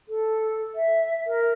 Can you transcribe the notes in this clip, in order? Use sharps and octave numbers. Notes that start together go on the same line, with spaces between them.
A4
E5
A#4